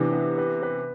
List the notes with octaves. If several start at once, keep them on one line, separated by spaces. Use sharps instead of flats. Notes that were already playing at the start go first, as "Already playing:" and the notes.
Already playing: C3 E3 B3 D4
B3
B4
B4